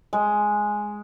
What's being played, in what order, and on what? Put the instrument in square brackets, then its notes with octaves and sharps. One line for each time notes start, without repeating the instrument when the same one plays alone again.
[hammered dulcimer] G#3